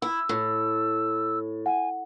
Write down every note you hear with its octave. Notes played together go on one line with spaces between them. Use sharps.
E4 E6
A2
F#5 G#5